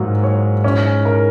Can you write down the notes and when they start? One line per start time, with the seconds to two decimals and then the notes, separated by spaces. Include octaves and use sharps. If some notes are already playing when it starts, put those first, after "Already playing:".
Already playing: G#2 F#3 A#3 F#4
0.24 C#5
0.64 C#4
1.05 A#4